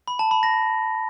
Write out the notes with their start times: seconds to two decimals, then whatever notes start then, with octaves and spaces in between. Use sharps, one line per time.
0.08 B5
0.19 A5
0.31 B5
0.43 A#6